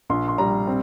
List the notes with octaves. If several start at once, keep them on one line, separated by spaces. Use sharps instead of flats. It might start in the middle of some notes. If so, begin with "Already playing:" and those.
A#1 C6
C6
G3 A#5
C4